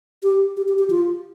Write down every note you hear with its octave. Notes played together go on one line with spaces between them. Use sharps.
G4
G4
G4
G4
F4